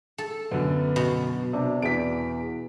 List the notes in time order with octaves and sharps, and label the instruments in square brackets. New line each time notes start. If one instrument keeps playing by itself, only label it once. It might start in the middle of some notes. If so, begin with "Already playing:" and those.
[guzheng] A4
[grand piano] F#2 D3 [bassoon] B3
[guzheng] B2
[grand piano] C3 [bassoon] D4
[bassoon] E2 [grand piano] B6 D7